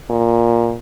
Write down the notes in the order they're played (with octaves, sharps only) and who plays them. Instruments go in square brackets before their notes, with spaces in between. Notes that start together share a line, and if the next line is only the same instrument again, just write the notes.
[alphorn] A#2